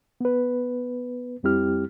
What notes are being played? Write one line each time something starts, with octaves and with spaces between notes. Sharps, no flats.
B3 B4
F2 G3 C4 E4 G4 F6